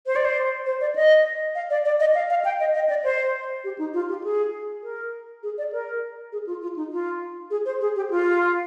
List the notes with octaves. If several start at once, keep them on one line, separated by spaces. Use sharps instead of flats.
C5
D5
C5
C5
D5
D#5
F5
D5
D5
D#5
F5
F5
G5
D#5
D#5
D5
C5
G4
D#4
F4
G4
G#4
A#4
G#4
D5
A#4
G#4
F4
F4
D#4
F4
G#4
C5
G#4
G4
F4